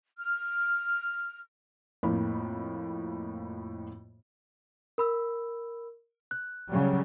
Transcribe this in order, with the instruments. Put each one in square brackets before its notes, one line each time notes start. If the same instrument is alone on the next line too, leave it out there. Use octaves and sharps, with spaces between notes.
[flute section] F6
[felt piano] F2 A2 A#3 F5 B5
[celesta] A#4 B5 E6
F#6
[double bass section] C#3 F#3 G3